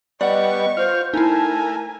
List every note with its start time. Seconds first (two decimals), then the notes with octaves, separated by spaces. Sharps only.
0.21 G3 B3 D5 D#5 F#5 C#6
0.77 F4 C5 F6
1.14 A3 D#4 E4 A#4 G#5 A5